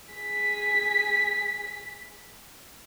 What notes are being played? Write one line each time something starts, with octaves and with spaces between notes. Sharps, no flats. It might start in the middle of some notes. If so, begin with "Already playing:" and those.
G#4 B6